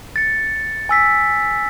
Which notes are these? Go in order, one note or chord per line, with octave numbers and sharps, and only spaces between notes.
A6 C#7
G#5 E6 B6